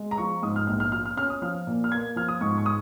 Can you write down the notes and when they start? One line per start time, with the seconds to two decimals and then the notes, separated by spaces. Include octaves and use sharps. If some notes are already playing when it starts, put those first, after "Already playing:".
Already playing: G#3
0.11 A#5
0.18 F3 C#6
0.43 G#2 D#6
0.56 F6
0.67 A#1 F6
0.80 F6
0.92 F4 F6
1.06 F6
1.17 C#4 F6
1.30 D#6
1.42 F3 F6
1.67 A#2
1.84 F6
1.91 A#3 G#6
2.16 F3 F6
2.28 D#6
2.41 G#2 C#6
2.58 C#6
2.66 D#6